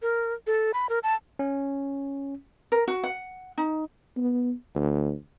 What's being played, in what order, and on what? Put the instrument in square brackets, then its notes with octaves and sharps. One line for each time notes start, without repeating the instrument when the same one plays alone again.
[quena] A#4
A4
B5
A#4
A5
[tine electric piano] C#4
[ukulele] A#4
F#4
F#5
D#4
[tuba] B3
D2